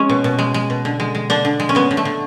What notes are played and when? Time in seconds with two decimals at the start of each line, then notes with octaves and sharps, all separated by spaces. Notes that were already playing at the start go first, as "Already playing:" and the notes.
Already playing: G#3 C#4
0.09 B2
0.24 B2
0.39 G#3
0.54 G#3
0.70 B2
0.85 D3
1.00 G#3
1.15 G#3
1.30 D3 D4
1.45 D3
1.60 G#3
1.69 C#4
1.75 G#3 B3
1.91 D3
1.97 A3
2.05 D3